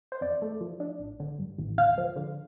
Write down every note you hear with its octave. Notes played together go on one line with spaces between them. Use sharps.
C5
F2 D5
A3
F3
D4
A1
D3
G2
A1
D2 F5
F3
D3